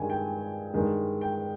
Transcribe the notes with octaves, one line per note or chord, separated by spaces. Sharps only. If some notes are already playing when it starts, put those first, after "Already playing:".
Already playing: G2 D#3 G#3 G#5
G5
G2 D#3 G#3
G5